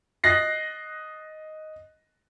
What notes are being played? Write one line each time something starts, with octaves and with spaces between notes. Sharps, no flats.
D#5 F#6 A6 A#6 C7